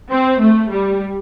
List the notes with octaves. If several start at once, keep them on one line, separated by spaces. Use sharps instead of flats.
C4
A3
G3